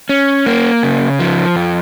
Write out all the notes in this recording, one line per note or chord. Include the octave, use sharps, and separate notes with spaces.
C#4
A#3
C#3
F3
F2